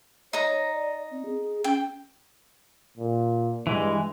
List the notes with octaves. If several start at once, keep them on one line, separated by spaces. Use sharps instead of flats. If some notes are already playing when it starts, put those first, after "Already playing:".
D#4 C#5 A#5
D5
C4
G#4
C#4 G5
A#2
G2 E3 G#3